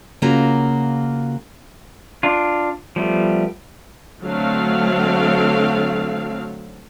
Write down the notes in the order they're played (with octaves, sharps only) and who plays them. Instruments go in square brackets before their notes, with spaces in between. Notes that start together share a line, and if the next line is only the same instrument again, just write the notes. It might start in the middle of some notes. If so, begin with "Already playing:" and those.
[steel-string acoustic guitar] C#3 A#3 F4 F#4 A#5
[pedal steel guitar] D4 F4
F3 G3 A3 B3
[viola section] D3 F#3 A3 C4 F5